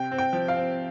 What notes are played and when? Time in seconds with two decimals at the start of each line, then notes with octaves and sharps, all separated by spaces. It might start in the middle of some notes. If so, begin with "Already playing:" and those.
Already playing: C3 G5
0.11 C4
0.18 G5
0.33 F3
0.48 F5
0.56 C4